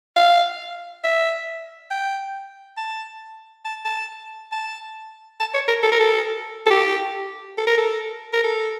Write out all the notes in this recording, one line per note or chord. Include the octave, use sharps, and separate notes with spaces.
F5
E5
G5
A5
A5
A5
A5
A5
C#5
A#4
A4
A#4
A4
A4
G4
A4
A#4
A4
A#4
A4